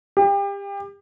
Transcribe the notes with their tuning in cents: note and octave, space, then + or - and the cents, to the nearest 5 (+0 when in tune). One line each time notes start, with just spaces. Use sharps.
G4 +30